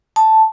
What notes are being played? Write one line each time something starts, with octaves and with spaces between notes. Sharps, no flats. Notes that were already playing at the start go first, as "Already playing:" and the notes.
A5